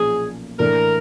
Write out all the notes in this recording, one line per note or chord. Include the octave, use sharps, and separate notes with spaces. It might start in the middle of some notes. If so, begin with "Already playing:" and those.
Already playing: B1 A#2 F3 C#4 G#4
A2 E3 A3 D4 A#4